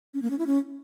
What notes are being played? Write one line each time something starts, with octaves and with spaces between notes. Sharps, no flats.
C#4
A#3
C#4
E4
C#4